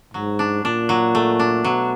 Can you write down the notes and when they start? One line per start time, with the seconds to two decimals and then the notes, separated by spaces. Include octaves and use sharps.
0.14 G#2 F#3
0.39 D4
0.65 A#2 D4
0.89 F#3
1.15 A3
1.39 D4
1.64 B2 F#3